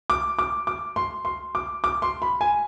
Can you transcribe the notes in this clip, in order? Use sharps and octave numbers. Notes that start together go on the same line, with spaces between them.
D6
D6
D6
C6
C6
D6
D6
C6
B5
G#5